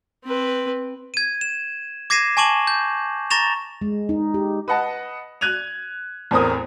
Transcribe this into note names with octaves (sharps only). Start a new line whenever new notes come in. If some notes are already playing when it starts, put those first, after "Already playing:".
C4 B4
G#6 D#7
E7
D6 G#6 A#6 C7 D#7 E7
G#5 A5 C#6 D6 E7 F#7
G6
A#5 C#6 A6 A#6 E7 F7
G#3
D#4
G4
B4 D#5 F#5 A5
F#6 G#6 D#7 F7
E2 A2 C4 A#4 D#6